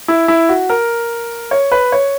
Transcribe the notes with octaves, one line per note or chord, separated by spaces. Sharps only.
E4
E4
F#4
A#4
C#5
B4
C#5